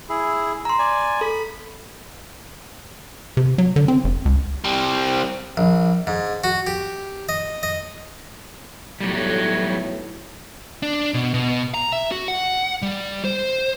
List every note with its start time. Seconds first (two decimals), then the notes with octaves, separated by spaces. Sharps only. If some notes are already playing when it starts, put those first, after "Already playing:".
0.09 E4 G#4
0.65 A#5 C6
0.79 D5 G#5
1.21 A4 B5
3.37 C3
3.58 F#3
3.76 D3
3.88 C4
4.04 F1
4.25 C#2
4.64 G3 C4
5.57 A#1
6.07 G#2
6.44 F#4
6.67 G4
7.29 D#5
7.63 D#5
9.01 B1 A2 F#3 G3
10.82 D4
11.14 B2
11.34 B2
11.74 A#5
11.93 E5
12.12 F#4
12.28 F#5
12.82 G3
13.24 C5